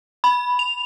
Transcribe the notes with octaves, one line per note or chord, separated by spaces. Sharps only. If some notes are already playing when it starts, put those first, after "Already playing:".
B5
F7